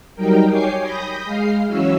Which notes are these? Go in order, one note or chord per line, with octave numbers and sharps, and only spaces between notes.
F#3 G3 D#4 A#4 G5
C#5 G5 G#5 D6 C7
B5 D#6 G6 A#6
G#3 F5 C7
E3 F#3 C#4 C#5 E6